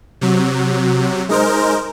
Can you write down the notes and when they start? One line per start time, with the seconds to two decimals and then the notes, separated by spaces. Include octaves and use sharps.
0.21 C3 F#3
1.29 G#3 D#4 A#4 C5